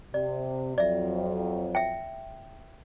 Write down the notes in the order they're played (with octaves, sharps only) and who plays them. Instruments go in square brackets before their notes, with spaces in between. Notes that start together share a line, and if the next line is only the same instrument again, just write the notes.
[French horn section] C3 [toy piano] D5
[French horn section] F2 F#3 [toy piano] D5 E5
[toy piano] E5 G5